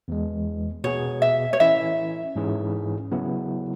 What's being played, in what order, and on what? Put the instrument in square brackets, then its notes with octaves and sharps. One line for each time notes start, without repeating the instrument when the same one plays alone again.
[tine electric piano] E2 E3 G#3
[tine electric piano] B2 B3 G#4 [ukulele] C#5
[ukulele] E5
C#5
[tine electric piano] E3 C#4 E4 [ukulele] E5
[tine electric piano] G#2 E3 C#4 E4 G#4
C#3 F#3 B3 E4